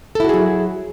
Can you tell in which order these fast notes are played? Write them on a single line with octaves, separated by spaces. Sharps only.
A4 E4 F#4 G#4 F#3